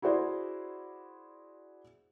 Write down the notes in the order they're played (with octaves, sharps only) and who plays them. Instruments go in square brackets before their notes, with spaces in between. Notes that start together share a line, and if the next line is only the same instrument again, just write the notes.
[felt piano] E4 F#4 G#4 C5 D5